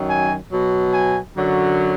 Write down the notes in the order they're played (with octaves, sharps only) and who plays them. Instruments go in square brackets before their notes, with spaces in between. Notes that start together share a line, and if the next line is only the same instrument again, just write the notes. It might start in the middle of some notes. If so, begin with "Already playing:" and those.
Already playing: [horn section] F#2 D#3 F#3
G#5
B2 F#3
G#5
F#2 D3 F#3